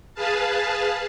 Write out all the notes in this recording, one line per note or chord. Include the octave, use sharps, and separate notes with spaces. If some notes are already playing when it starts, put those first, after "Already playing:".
G#4 B4 F5 A5